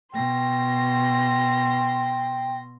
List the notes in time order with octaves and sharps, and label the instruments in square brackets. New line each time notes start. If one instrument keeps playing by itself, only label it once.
[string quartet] B2 C6 A#6 [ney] G5